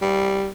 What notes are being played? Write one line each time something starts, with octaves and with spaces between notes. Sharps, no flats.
G3